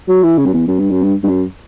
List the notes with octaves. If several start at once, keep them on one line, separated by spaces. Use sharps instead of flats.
F#3
E3
C#3
F#2
E2
F#2
G2
F#2
G2
G2
F#2